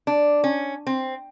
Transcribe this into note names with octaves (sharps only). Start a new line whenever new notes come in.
D4
C#4
C4